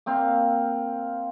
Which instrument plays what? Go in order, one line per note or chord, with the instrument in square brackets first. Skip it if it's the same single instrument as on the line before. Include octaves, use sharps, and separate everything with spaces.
[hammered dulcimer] A#3 C4 F5